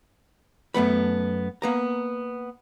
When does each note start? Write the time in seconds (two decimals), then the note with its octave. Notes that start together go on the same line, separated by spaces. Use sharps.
0.74 F#2 A3 B3 B5
1.62 A#3 B3 A#5